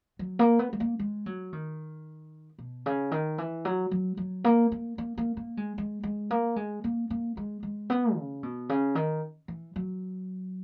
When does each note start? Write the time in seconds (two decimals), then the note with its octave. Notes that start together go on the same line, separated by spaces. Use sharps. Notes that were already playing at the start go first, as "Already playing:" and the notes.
0.19 F#3
0.39 A#3
0.59 B3
0.73 G#3
0.80 A#3
0.99 G#3
1.26 F#3
1.53 D#3
2.58 B2
2.86 C#3
3.11 D#3
3.38 E3
3.65 F#3
3.91 F#3
4.17 F#3
4.44 A#3
4.72 A#3
4.98 A#3
5.18 A#3
5.37 A#3
5.57 G#3
5.78 G#3
6.03 G#3
6.31 A#3
6.56 G#3
6.84 A#3
7.10 A#3
7.37 G#3
7.63 G#3
7.90 B3
8.16 C#3
8.43 B2
8.69 C#3
8.95 D#3
9.48 E3
9.76 F#3